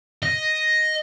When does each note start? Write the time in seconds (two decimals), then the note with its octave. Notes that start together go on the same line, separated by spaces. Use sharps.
0.23 D#5